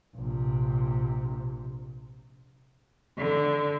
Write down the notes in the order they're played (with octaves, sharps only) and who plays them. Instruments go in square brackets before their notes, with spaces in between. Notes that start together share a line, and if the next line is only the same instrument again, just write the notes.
[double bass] A#1 C3
[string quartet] D3